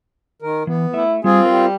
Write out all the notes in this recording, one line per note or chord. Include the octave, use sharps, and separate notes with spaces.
D#3 A#4
E3 B3
A3 E4 E5
G3 C4 F4 G#4
G3 A#4 C5